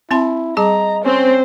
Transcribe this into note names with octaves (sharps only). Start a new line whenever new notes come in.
C4 E4 A5 C6
G3 G#4 D#5 A5 A#5
C4 C#4 C5